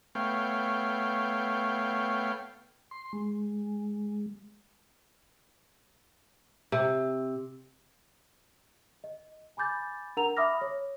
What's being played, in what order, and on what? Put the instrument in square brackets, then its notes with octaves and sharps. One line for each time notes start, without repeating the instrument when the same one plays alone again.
[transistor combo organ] A3 B3 C#5 F5 G5
[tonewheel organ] C6
G#3
[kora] C3
[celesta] D#5
G#5 B5 D6 G6 A6
D4 A#4 F#5 A#5 F7
E5 B5 D6 D#6 F6 A#6
C#5